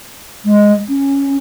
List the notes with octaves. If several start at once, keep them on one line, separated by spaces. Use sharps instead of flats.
G#3
C#4